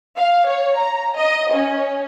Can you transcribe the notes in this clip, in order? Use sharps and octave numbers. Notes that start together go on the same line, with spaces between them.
F5
C#5
A#5
D#5
C#4